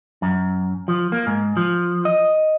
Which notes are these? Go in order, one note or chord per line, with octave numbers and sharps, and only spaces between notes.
F#2
F3
A#3
G#2
F3
D#5